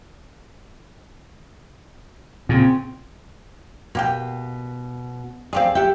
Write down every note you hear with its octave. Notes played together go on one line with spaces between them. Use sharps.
A#2 C#3 C4
B2 A#3 G4 G5
C4 G4 G#4 D5 F5
G4 E5 F#5 G5